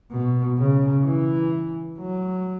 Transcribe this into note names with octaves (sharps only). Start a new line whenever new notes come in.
B2
C#3
E3
F#3